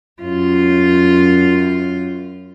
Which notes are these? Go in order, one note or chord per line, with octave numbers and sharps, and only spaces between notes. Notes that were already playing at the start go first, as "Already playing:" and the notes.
F#2 F4